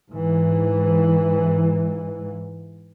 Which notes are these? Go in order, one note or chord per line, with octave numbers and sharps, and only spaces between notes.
G#2 E3